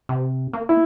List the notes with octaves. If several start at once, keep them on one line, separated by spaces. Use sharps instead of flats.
C3
A#3
E4